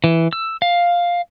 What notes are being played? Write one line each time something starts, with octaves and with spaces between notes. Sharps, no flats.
E3
E6
F5